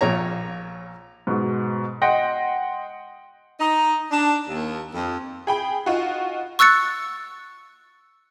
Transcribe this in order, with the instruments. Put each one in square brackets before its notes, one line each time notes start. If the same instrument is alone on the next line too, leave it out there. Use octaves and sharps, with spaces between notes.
[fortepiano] A#1 A#2 C#5 A#5
[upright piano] G#2 B2
D#5 F#5 G5 C6 A#6
[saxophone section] D#4
D4
D#2
F2
[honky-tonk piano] G#4 G5 B5
D#4 F4 F#4
[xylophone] C#6 E6 F#6 A6 C#7